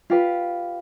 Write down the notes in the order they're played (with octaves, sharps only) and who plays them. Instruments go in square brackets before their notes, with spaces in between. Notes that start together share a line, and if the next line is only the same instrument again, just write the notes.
[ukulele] F4 G4 B4